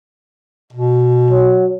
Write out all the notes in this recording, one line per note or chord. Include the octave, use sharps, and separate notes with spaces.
B2
F#3